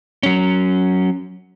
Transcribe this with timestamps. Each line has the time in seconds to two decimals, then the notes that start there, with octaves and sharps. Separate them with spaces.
0.23 F#3 C#4